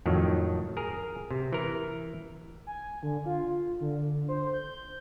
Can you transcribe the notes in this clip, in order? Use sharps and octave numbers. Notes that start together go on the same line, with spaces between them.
F2 A2 D#3 F#3
G#4 A#4
C3
E3 A#4
G#5
D3
F4
D3
C5
G6